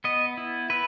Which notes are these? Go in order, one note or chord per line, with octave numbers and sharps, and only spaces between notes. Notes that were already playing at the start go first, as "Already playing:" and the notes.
B3 D#5
E4
E4 B4